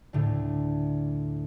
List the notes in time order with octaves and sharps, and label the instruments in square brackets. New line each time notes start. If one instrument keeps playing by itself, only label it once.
[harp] D2 A2 D3